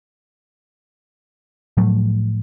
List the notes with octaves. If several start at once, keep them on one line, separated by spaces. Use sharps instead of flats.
A2 F3 F#3 A3